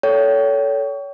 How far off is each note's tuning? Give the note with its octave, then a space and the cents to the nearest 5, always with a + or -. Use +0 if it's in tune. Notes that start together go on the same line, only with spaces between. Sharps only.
A4 +0 C#5 +30 G5 -25